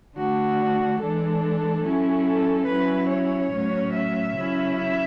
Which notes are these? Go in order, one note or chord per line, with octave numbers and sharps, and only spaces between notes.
D3 A3 D4 F#4
E3 G#3 D4 A4
F#3 C#4 E4
A4
F#3 C#4 E4 B4
C#5
A2 F#3 C#4
E5
C#3 F#3 C#4 E4
E5